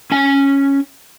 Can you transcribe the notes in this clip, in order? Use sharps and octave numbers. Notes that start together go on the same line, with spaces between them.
C#4 G#5